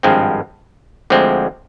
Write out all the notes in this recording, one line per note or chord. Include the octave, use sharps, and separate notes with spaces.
G#1 G2 F3 G#3 C4
D2 D3 F3 G#3 C4